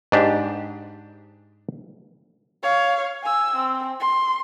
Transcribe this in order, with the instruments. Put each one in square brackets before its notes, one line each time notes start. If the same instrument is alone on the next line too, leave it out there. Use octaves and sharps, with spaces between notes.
[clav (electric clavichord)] G#2 D4 G4
[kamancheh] C#5 F5
G#5 E6
C4
C6